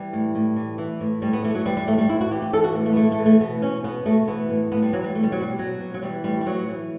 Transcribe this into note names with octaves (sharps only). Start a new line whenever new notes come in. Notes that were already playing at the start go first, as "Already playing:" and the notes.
Already playing: E3 G3
A2
A2
E3
E3
A2
A2 G3
B3
E3 A3
F#3
E3 G3
G3
A2 A3
G3
A2 E4
F#4
E3 G4
G4
E3 A4
F#4
A2
A3
B3
A2 A3
A3
E3
A3
B2 B3
B2 C#4
B2 B3
B2 A3
E3 B3
A2
A2 B3
G3
E3 F#3
G3
B2 A3
G3
F#3
B2 G3
B2 F#3
B2
F#3
E3 G3
A2 G3
G3
A2 F#3
E3